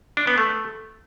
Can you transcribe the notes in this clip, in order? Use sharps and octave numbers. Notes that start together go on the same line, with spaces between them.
D4
B3
A3